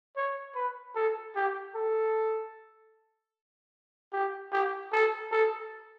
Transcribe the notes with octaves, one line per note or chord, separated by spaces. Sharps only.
C#5
B4
A4
G4
A4
G4
G4
A4
A4